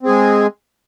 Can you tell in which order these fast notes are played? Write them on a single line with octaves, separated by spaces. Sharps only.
C4 G#4 G#3